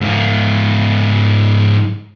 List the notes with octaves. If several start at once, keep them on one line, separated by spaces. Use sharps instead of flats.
G#2 F4